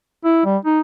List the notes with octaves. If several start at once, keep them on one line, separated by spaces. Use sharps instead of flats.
E4
G3
D#4